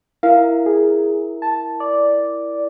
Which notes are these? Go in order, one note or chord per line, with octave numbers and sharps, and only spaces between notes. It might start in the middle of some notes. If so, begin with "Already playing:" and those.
E4 A#4 F5
G#4
A5
D5